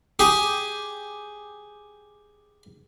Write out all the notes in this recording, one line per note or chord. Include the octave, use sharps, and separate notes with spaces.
G4 G#4